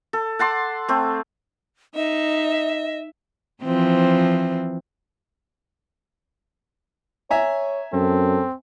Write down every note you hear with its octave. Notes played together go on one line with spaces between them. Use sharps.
A4
F#5 A5 C6 D6
A3 C4
D#4 D#5 E5
E3 F3 C4
C#5 E5 G#5 A#5
F#2 C4 A4